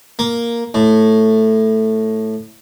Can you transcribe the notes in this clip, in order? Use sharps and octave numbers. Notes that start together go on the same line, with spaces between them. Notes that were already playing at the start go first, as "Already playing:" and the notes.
A#3
A2